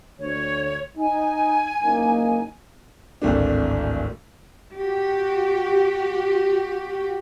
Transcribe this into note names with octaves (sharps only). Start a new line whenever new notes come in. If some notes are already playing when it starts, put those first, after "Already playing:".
D2 C#5
D#4 G#5
F#1 A#3 D#4
D1 G#1 A3 D4
F#4 G4